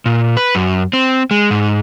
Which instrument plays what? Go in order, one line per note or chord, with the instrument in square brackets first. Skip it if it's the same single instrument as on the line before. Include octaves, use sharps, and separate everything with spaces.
[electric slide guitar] A#2
B4
F#2
C4
G#3
G#2